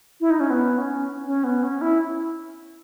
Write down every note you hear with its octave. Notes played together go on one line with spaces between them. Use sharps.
E4
D#4
C#4
B3
C#4
C#4
B3
C#4
E4